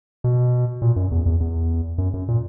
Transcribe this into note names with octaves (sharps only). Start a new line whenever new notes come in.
B2
A#2
F#2
E2
E2
E2
F#2
F#2
A#2